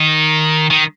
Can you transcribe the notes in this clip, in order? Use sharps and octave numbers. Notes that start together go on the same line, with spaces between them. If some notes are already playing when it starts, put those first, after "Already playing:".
Already playing: D#3
D#3